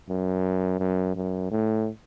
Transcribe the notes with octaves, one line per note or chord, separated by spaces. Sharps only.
F#2
F#2
F#2
A2